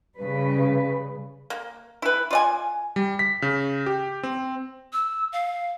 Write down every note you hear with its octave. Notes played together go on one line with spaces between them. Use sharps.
C#3 G3 B4
A#3
E4 B4
F4 D5 G#5
G3
B6
C#3
G4
C4
E6
F5